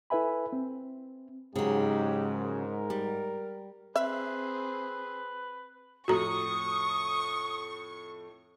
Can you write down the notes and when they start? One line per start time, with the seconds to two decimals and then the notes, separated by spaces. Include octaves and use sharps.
0.10 E4 A4 B4 E5 G#5 B5
0.53 C4
1.56 G#2 C#3 F#3 G4
2.36 A#4
2.90 G3
3.96 C4 G#4 B4 E5
6.08 F2 A2 A3 F#4 A#5 C#6 D#6